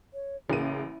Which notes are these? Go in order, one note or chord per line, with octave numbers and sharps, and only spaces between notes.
C#5
A1 C#3 A#3 E4 G#4 D#7